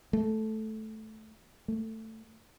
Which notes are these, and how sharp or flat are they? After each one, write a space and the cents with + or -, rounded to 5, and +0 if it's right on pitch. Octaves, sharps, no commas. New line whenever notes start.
A3 -10
A3 +15